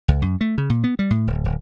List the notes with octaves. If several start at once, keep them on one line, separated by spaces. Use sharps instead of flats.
C#2
F#2
A3
C#3
A#2
B3
G3
A2
D1
D1